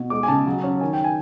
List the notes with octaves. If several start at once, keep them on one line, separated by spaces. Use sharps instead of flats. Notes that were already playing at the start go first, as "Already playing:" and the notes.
Already playing: B2
G#3 D6
G#5
C#3 A5
F#3
C#4
D#3 G#5
G5
G#5